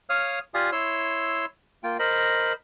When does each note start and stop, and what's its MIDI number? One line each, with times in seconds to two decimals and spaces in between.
0.10 0.39 73
0.10 0.39 77
0.10 0.39 87
0.10 0.39 89
0.54 0.70 65
0.54 0.70 67
0.54 0.70 74
0.54 0.70 77
0.54 0.70 80
0.54 0.70 87
0.72 1.45 64
0.72 1.45 73
0.72 1.45 84
0.72 1.45 88
1.83 1.97 58
1.83 1.97 65
1.83 1.97 79
1.99 2.53 70
1.99 2.53 72
1.99 2.53 75
1.99 2.53 83